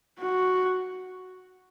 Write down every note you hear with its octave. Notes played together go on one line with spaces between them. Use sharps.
F#4